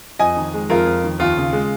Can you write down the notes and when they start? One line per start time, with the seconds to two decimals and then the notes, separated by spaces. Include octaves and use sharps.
0.19 F2 D#5 G#5
0.37 D#3
0.54 G#3
0.70 F2 F4 A#4
0.86 F2
1.04 D#3
1.19 D#2 F4
1.37 C#3
1.53 G#3